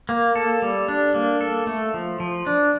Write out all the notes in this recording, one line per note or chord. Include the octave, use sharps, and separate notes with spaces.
A#3
A4
G3
D4
A#3
A4
A3
F3
F3
D4